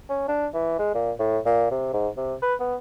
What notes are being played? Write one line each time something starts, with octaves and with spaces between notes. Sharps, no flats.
C#4
D4
E3
G#3
A#2
A2
A#2
C3
G#2
C3
B4
B3